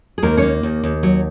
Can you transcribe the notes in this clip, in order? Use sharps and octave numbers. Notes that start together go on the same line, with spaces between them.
G#4
D#2 A#3 A#4
A#3 C#4 C#5
D#2
D#2
F#3